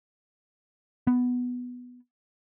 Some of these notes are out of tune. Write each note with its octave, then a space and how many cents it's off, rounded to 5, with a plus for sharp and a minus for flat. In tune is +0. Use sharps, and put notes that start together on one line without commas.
B3 +0